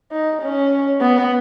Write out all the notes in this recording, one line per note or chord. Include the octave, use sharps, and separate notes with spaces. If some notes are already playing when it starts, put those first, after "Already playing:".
D#4
C#4
B3